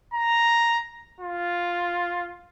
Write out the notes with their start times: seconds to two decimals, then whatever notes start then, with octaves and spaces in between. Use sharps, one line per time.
0.14 A#5
1.21 F4